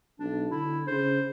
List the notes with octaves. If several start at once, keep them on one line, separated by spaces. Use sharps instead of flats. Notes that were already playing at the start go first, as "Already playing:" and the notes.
B1 D4
D3 E4
C#3 C5